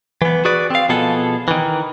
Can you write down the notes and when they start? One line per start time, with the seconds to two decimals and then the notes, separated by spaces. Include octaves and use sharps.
0.22 E3 B3
0.45 F#4 G#4 B4 D5
0.70 C4 F5
0.89 B2 F3 B3 G#4 A4
1.48 D#3 E3